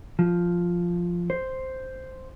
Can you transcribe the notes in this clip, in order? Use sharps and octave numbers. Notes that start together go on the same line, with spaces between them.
F3
C5